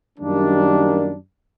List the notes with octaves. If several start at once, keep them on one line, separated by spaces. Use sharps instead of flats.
F#2 D#3 G3 A#3 D4